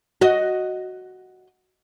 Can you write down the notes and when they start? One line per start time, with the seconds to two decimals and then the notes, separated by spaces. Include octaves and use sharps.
0.21 F#4 D#5